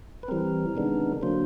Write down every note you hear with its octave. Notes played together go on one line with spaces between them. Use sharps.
B4
E3 G3 C4 A#4
C3 D#3 G#3 B3 D4
D3 F#3 A#3 C5